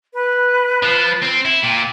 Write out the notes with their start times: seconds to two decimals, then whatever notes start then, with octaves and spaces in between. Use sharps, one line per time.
0.14 B4
0.83 F3
1.23 C4
1.45 E4
1.63 A#2 G5